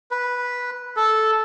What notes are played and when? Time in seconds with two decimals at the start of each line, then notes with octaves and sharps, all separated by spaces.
0.11 B4
0.96 A4